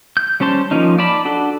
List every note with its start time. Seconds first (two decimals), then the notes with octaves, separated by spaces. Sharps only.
0.17 G6
0.40 G3 C#4 C5 A5 C6
0.71 F3 A#3 C#4 D#4
0.99 D5 A5 B5
1.25 D4 F#4 A4